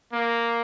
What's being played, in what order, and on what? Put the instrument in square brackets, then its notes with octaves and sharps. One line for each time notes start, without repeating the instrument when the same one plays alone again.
[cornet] A#3